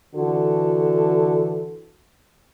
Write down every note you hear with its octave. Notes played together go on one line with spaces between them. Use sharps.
D3 E3 F#4 A4